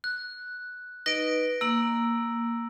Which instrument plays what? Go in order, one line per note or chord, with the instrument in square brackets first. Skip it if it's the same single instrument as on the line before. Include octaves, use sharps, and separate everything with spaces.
[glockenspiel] F#6
[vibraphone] D#4 B4 D#5 [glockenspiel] A#6 D7
[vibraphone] A#3 [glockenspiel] E6 F#7